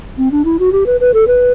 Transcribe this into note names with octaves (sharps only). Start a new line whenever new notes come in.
C4
D4
E4
F#4
G4
B4
B4
A4
B4